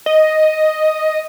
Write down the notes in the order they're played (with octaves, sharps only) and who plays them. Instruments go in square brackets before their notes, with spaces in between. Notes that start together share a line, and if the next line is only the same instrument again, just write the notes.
[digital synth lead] D#5